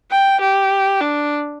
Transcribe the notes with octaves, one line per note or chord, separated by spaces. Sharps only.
G5
G4
D4